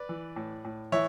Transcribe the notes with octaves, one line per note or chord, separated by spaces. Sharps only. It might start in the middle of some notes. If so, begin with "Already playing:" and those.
Already playing: B4 D5
E3
A2
A2
E3 C#5 E5